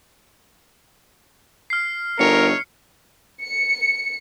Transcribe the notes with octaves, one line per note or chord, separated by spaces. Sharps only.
F6 C7
G1 A3 D#4 A#4 C#5 C#7
C#7